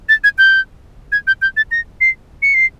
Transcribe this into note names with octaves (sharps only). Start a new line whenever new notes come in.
A6
G#6
G6
G#6
G6
G6
A6
A#6
C7
C#7
C7